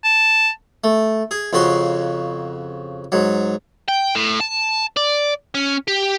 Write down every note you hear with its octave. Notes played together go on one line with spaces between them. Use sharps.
A5
A3
G#4
F2 C#3 F#4 C6
G#2 F#3
G5
A2
A5
D5
C#4
G4